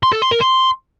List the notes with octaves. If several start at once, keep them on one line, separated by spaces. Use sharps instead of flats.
C6
A4
C6
A#4
C6